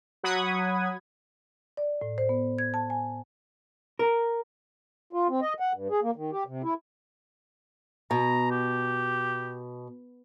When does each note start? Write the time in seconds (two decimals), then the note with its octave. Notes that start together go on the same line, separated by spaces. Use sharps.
0.23 F#3 F#5 B5 D#6 G#6
1.77 D5
2.01 A2
2.18 C5
2.29 B3
2.58 G#6
2.74 A5
2.90 G#5
3.99 A#4
5.13 F4
5.29 C4
5.42 D#5
5.60 F#5
5.73 G2
5.90 G#4
6.03 A#3
6.16 D#3
6.32 G4
6.47 C3
6.64 E4
8.11 B2 A#5
8.51 G4